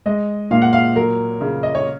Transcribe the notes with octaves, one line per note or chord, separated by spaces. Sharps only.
G#3 D#5
A#2 F5
F#5
F5
F#3 A#4
C#3
D#5
C#5